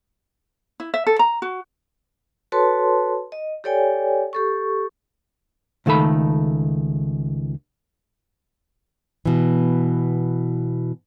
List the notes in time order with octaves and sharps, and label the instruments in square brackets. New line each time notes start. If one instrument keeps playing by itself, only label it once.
[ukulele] E4
E5
A4
A#5
F#4
[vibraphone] F#4 A4 B4 C#5 A5 C6
D#5
G4 A4 C#5 D5 G5 G#5
G4 A4 C#6
[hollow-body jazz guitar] C#2 D#3 A3 A4 B5
[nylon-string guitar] B2 E3